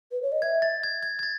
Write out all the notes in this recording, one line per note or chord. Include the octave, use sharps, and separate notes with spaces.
B4
C#5
D#5
E5 G#6
A6
G#6
G#6
G#6
A6